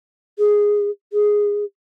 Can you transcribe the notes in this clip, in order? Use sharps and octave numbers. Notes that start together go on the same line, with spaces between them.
G#4
G#4